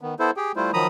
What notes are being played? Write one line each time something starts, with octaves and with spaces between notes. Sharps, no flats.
D#3 B3
B3 E4 A4 C5
G4 G#4 G5
G3 A3 E4 F4 C5
D#3 F3 F#3 A#5 B5 D#6